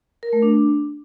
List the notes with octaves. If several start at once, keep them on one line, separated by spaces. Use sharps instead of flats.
A#4
A3
D4